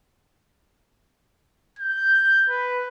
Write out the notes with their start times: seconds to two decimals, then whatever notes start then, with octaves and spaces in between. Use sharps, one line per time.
1.79 G6
2.50 B4